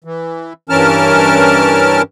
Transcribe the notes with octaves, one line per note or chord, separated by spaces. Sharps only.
E3
G2 E3 C#4 A#4 A5 F6